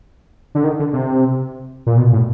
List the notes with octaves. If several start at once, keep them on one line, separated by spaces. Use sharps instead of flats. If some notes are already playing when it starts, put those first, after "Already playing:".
D3
D#3
D3
C3
A#2
B2
A2